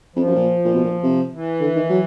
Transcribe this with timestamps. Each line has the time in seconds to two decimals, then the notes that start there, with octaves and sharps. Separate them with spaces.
0.16 F2 F3
0.27 F#2
0.35 A#2
0.65 A#2
0.74 B2
0.84 A#2
1.03 C3
1.32 E3
1.61 D3
1.76 D#3
1.90 F#3